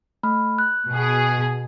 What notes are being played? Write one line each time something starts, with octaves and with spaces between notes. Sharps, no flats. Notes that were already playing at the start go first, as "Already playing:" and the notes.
A3 B5 F6
F#6
B2 G#4